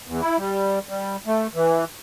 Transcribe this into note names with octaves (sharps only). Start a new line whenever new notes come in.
E2
E4
G3
G3
A3
E3